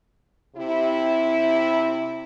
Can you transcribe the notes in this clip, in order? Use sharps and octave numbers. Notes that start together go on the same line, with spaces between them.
C3 E4